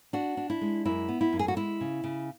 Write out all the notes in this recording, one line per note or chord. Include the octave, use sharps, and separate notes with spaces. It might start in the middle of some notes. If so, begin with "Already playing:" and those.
D4 F#4
D4
E4
G#3
F#2 E4
B3
E4
F#2
G#4
F#4
G#3 E4
C#3
C#3